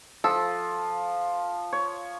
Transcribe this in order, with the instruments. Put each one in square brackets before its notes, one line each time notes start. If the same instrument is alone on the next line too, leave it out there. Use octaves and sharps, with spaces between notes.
[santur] F3 [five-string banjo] A4
[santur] C#5